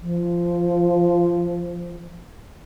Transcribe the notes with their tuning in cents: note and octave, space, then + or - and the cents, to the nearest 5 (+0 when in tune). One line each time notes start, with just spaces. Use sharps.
F3 -15